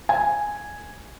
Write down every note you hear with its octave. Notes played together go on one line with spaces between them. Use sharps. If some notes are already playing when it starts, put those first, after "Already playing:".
G#5